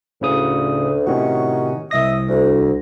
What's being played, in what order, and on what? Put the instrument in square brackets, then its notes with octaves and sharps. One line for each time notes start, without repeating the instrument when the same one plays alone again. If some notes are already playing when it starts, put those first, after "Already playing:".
[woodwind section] D2 [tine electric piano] A2 C#3 D#6
[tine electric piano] A2 C3 D#3 [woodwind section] C#4 D#4 F#4
[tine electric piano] C2 A#6 [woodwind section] D#5 E5 D#6
[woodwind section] D2